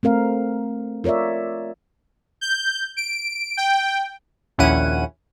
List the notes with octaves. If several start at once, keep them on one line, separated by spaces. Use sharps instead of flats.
A3 C4 A#4 F5
F4 A#4 C#5 D5 E5
G6
D7
G5
A#1 D#2 C#4 E4 F#5 D#7